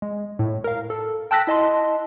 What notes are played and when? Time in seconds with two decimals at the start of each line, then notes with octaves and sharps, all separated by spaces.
0.02 G#3
0.39 A2
0.64 A#4 F5
0.90 A4
1.31 G5 A5 E6 F#6 A#6 B6
1.47 E4 D#5 A5 C6